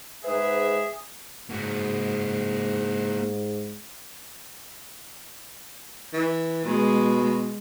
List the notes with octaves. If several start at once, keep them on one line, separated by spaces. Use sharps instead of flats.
G#2 G#4 B4 E5
G#2 A#3 F#4
E3
B2 G#3